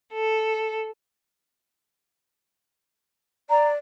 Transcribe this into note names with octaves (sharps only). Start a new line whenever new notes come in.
A4
D5 A#5